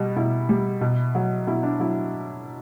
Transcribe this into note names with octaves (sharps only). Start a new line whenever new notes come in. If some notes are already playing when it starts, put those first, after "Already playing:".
Already playing: B2 G3
B2 E4
G3
B2
F#3
B2 E4
D4
F#3 E4